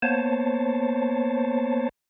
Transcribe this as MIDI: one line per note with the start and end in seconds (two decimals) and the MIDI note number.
0.02 1.89 58
0.02 1.89 59
0.02 1.89 72
0.02 1.89 73
0.02 1.89 81